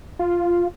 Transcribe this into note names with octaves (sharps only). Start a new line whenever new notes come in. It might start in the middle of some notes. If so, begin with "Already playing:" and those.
F4